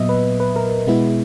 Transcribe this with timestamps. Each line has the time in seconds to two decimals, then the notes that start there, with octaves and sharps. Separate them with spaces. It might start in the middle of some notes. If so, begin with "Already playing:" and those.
Already playing: A#2 F#3 B3 D#5 E5
0.09 B4
0.40 B4
0.56 A#4
0.87 B2 G#3 B3 E4